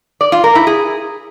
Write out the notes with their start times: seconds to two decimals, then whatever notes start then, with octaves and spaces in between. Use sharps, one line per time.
0.21 D5
0.32 F4
0.44 A#4
0.55 E4
0.67 G#4